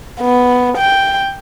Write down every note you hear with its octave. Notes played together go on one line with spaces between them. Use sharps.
B3
G5